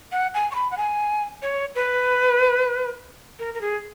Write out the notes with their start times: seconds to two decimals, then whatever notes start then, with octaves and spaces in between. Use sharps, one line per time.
0.12 F#5
0.34 G#5
0.51 C#6
0.55 B5
0.71 F#5
0.77 G#5
1.42 C#5
1.75 B4
3.39 A#4
3.54 A#4
3.61 G#4